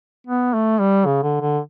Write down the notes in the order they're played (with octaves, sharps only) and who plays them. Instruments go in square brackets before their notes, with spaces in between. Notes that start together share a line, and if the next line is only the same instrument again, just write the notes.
[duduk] B3
A3
G3
C#3
D3
D3